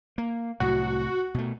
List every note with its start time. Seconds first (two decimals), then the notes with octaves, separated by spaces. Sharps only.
0.18 A#3
0.60 C2 A2 F#3 F#4
1.34 B2 A3